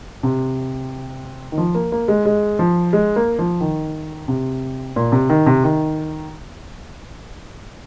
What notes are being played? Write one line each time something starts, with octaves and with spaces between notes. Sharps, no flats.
C3
D#3
F3
A#3
A#3
G#3
G#3
F3
G#3
A#3
F3
D#3
C3
A#2
C3
D#3
C3
D#3